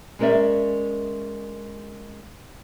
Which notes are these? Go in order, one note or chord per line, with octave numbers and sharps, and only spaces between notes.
G#3 C#4 A#4 C5 D5 E5